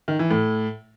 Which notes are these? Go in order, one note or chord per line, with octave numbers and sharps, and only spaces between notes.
D#3
E3
A2